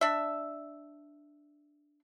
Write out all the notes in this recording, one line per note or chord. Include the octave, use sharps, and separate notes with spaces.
D4 E5